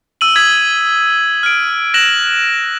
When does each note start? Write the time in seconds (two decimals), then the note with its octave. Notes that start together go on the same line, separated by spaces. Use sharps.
0.21 E6 D#7 F#7
0.35 D#6 G#6 B6
1.43 F6 D7
1.94 F#6 A#6 E7 F#7